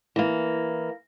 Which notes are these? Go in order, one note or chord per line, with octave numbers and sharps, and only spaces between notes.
E3 A#3